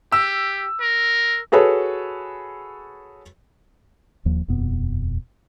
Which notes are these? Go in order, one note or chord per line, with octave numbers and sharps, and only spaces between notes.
G4 E6
A#4
F#4 G#4 A4 B4 C#5
D1 D#2 F3 A#3
D#1 F2 B2 B3